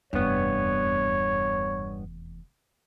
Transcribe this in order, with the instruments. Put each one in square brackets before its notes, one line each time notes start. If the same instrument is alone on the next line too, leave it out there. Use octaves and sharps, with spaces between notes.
[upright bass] F1 E2 [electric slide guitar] G2 B3 [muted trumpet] C#5